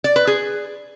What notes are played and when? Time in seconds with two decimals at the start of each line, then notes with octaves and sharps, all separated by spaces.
0.04 D5
0.16 B4
0.27 G#4